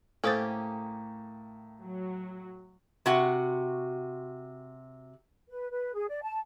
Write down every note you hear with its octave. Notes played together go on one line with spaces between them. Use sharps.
A2 A#3 C#4 G4 A4 C5 D#6 A6
F#3
C3 F#4 F#5
B4
B4
G#4
D5
A5